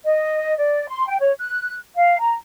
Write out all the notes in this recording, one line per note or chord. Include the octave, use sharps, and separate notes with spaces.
D#5
D5
C6
G5
C#5
F#6
F5
A#5